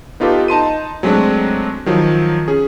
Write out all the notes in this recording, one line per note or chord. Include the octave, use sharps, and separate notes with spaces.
B3 D#4 F4 G4 A4 B4
D#4 A5 C6 D#7
F#3 G#3 A3 C4 D4
D#3 F3 F#3
C#4 G#4